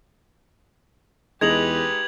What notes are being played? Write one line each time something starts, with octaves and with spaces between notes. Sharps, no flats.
E2 G#3 D#4 G4 B4 G#6 F7 F#7